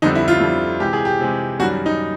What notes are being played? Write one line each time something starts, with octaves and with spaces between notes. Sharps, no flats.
F2 D3 G3 D#4
E4
F4
F2 D3 G3
C3 E3 G#3 G4
G#4
G4
C3 E3 G#3
F#2 D#3 G3 F#4
D#4